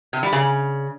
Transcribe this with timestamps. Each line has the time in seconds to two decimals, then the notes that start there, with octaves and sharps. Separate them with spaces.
0.13 C3
0.23 G3
0.33 C#3